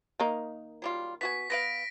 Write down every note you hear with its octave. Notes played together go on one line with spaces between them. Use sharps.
D#3 A#3 D#4
F#3 G3 F4
B3 F#4 G#5 B6
B3 B4 F5 A#6 D7